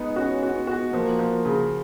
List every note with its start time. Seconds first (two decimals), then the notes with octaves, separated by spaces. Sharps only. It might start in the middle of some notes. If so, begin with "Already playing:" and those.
Already playing: G#3 B3 D#4
0.16 C#4 F#4
0.43 F#4
0.55 B3
0.67 F#4
0.93 F3 A#3
1.19 F3
1.45 C#3